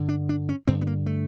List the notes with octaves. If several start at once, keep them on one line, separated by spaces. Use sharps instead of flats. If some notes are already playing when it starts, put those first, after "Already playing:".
Already playing: G2 D3
D4
D4
C#4
G2 D3 C4
B3
A#3
A3